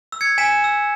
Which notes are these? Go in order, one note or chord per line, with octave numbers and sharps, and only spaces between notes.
E6
G#6 C#7
G#5 B6 E7
E6